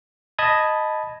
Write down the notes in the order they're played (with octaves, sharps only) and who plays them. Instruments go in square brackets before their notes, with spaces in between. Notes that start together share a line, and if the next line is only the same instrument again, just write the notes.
[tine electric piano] D#5 A5 B5 D#6 G#6